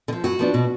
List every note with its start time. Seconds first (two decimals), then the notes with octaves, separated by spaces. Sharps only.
0.08 D3
0.13 F3
0.24 F#2 F#4
0.39 F3 B3 D4
0.54 B2